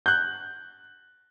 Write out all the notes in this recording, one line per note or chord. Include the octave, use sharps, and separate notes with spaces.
F#6 G6